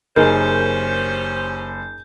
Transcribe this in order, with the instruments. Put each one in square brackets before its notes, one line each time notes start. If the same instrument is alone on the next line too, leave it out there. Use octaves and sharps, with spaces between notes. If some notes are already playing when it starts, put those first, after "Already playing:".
[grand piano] F#1 [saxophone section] C#4 G4 C5 [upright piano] D#4 G#4 A#4 [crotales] G6